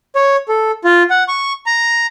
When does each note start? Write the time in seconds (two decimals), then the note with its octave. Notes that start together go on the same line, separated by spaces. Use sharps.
0.16 C#5
0.48 A4
0.84 F4
1.10 F#5
1.28 C#6
1.66 A#5